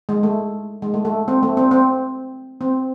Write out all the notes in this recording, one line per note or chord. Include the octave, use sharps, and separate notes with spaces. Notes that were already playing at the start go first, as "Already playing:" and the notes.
G#3
A3
G#3
A3
A3
C4
A3
C4
C4
C4